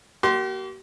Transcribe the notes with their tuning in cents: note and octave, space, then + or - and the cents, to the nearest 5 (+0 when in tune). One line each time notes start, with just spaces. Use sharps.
A#3 +0 G4 -45 C6 +0